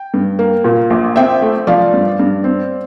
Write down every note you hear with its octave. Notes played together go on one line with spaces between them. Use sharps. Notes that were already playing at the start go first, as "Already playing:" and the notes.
Already playing: G5
G2
A#3
A#2
A#1
C4 E5 G5
A3
F3 D5 F5
G2
G2
C4